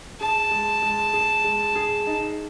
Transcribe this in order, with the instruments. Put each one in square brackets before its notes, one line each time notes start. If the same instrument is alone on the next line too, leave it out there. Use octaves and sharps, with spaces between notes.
[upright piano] G#4 [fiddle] A5
[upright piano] G#3
G#3
G#4
G#3
G#4
D#4